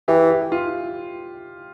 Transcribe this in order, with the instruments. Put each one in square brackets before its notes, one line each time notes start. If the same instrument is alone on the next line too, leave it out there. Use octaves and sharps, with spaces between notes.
[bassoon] E3 [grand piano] G4
[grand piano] G4
G4
G4
F4